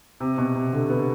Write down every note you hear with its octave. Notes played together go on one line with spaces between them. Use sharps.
C3
B2
C3
D3
B3